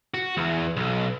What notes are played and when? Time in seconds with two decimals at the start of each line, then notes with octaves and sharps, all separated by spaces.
0.14 F#4
0.37 E2
0.76 B1